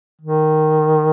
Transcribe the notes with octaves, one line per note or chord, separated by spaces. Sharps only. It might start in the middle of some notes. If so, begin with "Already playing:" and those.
D#3